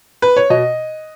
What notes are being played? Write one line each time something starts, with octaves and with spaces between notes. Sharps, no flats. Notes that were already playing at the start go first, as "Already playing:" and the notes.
B4
C#5
B2 D#5